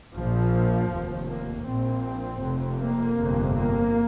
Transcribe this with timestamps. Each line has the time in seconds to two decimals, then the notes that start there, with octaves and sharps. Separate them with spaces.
0.15 A#1 A#2 F3
0.91 F1 D#2
1.28 A#3
1.66 A#1 A#2 C4
2.41 F1 F2 C3
2.79 A#3
3.17 G1 F2 C3
3.54 A#3